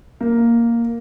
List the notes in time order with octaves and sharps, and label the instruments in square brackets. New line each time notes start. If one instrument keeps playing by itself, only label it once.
[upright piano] A#3